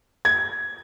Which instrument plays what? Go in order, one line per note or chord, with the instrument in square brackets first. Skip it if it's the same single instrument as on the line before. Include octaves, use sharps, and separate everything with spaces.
[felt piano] G#6